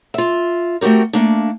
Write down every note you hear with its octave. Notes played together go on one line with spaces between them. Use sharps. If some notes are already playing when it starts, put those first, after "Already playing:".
F4 E5
A3 C4 F#4 G4 A#4
A3 A#3 D4